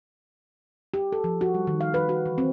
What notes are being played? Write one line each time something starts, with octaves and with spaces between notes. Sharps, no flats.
G4
A4
F3
F#4
G3
D#3
F5
B4
F#4
E3
C4